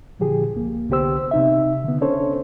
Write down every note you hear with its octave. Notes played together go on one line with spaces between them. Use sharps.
A#2 D3 F3 G4 G#4
C2 A#3
C2 D3 B3 G4 C5 E6
C3 D#4 E5
D3 B3
C#4 D4 A4 C5 C#5